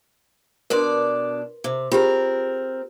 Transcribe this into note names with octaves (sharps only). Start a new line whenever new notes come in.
B2 D4 A#4 B4 D5 C6
C3
C4 F4 G4 G#4 A#4